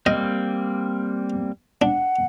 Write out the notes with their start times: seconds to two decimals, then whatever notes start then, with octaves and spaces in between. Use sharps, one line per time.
0.06 G3 A#3 C4 D#5
1.82 D4 F#5